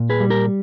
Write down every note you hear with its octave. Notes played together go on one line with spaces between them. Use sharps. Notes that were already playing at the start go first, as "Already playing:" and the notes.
Already playing: A#2
G#4 B4
G3
G4 A#4